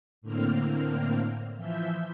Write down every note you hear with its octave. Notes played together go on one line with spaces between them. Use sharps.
A2 D3 A#3 C4 F6
E3 F3 E5 G6